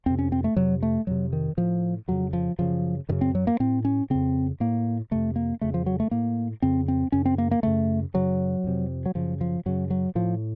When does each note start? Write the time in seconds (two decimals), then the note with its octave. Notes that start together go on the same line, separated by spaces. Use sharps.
0.06 F2 C4
0.10 C3
0.19 C#4
0.32 C4
0.44 A3
0.56 F2 C3 F#3
0.83 A3
1.07 F2 C3 F#3
1.33 D#3
1.57 A2 F3
2.08 F2 C#3 F#3
2.33 F3
2.58 F#2 C#3 F3
3.09 F#2 D#3
3.12 C#3
3.21 C4
3.35 F#3
3.47 A#3
3.60 A2 C4
3.85 C#4
4.10 F2 C#3 C4
4.60 A2 A#3
5.11 F2 C3 A3
5.36 A#3
5.61 F2 C#3 A3
5.74 F3
5.86 F#3
6.00 A3
6.11 A2 A#3
6.62 F2 C#3 C4
6.88 C4
7.12 F#2 C#3 C#4
7.26 C4
7.38 A#3
7.51 A#3
7.63 F#2 C#3 A3
8.14 F#2 C#3 F#3
8.64 F2 C3
9.06 F#3
9.15 F#2 C#3 F3
9.41 F3
9.66 F#2 C#3 F#3
9.91 F#3
10.15 A2 F3